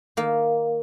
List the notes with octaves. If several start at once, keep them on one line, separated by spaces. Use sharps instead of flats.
D#3 A#3